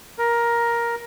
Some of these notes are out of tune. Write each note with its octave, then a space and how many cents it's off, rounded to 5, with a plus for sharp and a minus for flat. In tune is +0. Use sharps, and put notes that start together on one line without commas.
A#4 +10